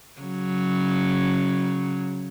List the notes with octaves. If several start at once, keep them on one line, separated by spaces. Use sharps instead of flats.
C#3 F#3